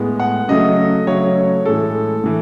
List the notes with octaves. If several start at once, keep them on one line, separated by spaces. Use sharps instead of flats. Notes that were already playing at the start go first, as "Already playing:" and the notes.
Already playing: A2 G#3 B3
F#5
C#3 F#3 A3 D#5
C#3 F#3 A3 C#5
A2 E3 G#3 A4
A2 E3